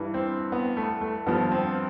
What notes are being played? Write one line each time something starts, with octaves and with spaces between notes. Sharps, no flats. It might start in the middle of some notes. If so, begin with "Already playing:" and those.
Already playing: G2 E3
C4
B3
A3
A3
G2 F3 B3
C4